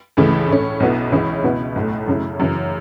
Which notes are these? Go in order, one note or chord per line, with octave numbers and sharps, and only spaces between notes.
C#2 C#3 E3 A3
A2 A3 C#4
B1 B2 B3 E4
C#2 C#3 E3 C#4 E4
C#2 B2 B3 E4
B1 A2 A3
F#2 C#3 A3 E4
F#2 C#3 E3